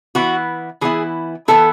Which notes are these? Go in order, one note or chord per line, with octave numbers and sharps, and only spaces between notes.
E3 B3 E4 F#4
E3 B3 E4 G#4
E3 B3 E4 A4